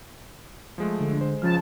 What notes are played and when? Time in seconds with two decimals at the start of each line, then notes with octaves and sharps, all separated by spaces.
0.78 F3 G#3 A3
0.99 D3
1.21 G#3 C5
1.42 C#2 C#3 F3 A5 F6